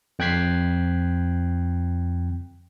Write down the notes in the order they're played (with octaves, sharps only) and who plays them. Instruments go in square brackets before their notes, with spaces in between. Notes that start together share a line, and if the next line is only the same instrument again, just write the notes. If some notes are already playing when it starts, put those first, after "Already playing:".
[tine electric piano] F2 G5 F#6 G#6 B6 C7